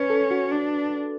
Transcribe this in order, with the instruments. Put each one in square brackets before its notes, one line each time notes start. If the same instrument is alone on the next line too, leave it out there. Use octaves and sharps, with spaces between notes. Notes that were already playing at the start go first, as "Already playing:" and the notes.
Already playing: [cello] C#4 [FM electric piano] B4
[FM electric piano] A4
F#4
[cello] D4